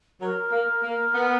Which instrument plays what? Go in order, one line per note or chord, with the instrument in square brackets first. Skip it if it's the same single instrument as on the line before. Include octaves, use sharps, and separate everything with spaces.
[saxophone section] F#3 [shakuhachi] A#4
[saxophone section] A#3
A#3
B3